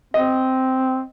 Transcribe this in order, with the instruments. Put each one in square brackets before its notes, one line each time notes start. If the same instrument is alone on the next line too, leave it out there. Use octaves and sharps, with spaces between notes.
[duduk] C4 [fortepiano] D#5